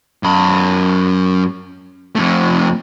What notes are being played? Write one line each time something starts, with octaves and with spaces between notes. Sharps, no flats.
F#2 B5
F2 A3